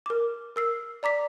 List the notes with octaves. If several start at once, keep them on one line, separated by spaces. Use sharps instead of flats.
A#4 D6
A#4 E6 C7
D5 A#5 D6 B6